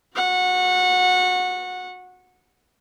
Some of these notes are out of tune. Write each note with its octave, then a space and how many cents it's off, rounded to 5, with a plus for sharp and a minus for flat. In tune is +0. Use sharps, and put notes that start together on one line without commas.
F#4 -25 F#5 -20